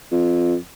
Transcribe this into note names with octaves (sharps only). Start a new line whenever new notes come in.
F2